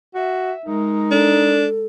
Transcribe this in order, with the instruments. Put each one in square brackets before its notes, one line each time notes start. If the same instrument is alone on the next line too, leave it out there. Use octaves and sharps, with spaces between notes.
[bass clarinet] F#4 [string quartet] E5
[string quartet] G#3 A#4 [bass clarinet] D#4
[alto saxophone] D4 [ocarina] A4